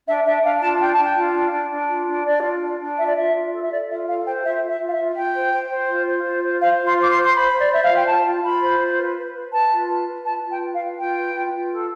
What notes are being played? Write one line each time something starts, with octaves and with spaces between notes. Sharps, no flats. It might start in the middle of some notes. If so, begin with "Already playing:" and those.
D4 E5
D4 E5
D4 F5
F4 A5
D4 G5
A5
D4 G5
F4
D4
D4
D4
F4
D4
D4 D5
F4
D4
D4
F4 E5
D5
F4 E5
F4
A4
E5
A4 D5
F4 E5
A4 F5
C5 G5
F4 E5
F4
E5
F4
F5
E5
F4
F4 G5
C5
C5
C5
F4
C5
F4
C5
C5 F5
F4
C6
C5 D6
C6
C5
C6
C5 B5
C5
D5
C5 E5
F5
F4
G5
F4 A5
F4
F4 B5
C5
F4
B4
B4
B4
B4 A5
F4
B4
B4
F4 A5
F4
G5
B4
F5
F4
F4 G5
B4
F4
F4
A4